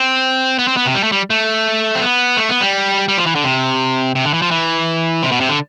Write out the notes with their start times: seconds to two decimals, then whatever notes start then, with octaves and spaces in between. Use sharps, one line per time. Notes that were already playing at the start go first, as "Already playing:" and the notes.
Already playing: C4
0.59 B3
0.68 C4
0.77 B3
0.85 C3
0.95 G3
1.03 A3
1.12 G3
1.30 A3
1.95 C4
2.01 B3
2.37 A3
2.49 B3
2.61 G3
3.08 G3
3.17 F3
3.26 E3
3.35 D3
3.44 C3
4.15 C3
4.25 D3
4.34 E3
4.42 F3
4.51 E3
5.23 C3
5.31 B2
5.40 C3
5.49 D3